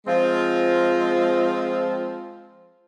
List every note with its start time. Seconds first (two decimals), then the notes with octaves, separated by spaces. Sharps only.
0.07 F3 G#3 C4 F4